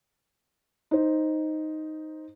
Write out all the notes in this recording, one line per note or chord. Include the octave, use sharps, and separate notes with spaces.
D#4 C5